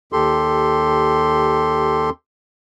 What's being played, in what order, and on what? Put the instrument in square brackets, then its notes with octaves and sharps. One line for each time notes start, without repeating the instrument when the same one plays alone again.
[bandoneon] D#2 G4 A4 C6